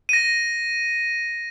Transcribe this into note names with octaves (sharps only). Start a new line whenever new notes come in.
A#6 D#7